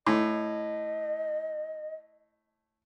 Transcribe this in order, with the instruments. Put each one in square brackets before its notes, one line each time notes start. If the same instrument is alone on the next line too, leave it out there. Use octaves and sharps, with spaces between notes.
[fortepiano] A2 [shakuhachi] D#5